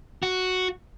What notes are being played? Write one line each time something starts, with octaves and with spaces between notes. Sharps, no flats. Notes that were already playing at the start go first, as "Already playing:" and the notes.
F#4